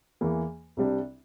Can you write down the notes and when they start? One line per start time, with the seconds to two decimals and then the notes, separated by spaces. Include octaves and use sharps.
0.21 E2 E3 A#3
0.77 C2 C3 G3 D4